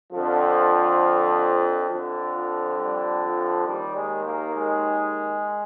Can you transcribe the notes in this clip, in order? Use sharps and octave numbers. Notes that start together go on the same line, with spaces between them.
F2 D3 F3
F2 D3
F3
G3
F3
D#2 D#3 G3
G#3
A#3
G#3